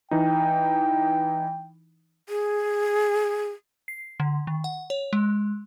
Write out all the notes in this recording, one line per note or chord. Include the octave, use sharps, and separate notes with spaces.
E3 D#4 G5
G#4
C7
D3
D#3
F#5
C#5
G#3